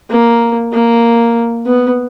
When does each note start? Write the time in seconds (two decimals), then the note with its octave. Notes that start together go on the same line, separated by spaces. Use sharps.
0.10 A#3
0.73 A#3
1.66 B3